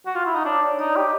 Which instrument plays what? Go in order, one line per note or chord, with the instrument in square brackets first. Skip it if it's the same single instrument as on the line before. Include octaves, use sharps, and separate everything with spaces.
[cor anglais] F#4
F4
E4
D#4
[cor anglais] D4 [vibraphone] C#5
[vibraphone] D5
[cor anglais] D#4 [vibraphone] D5
[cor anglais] G4 [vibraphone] D#5